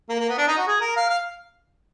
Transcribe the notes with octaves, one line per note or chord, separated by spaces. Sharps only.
A#3
A#3
B3
D4
D#4
F#4
G#4
A#4
F5
F5